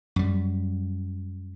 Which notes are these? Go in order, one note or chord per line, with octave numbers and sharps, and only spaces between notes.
F#2 G3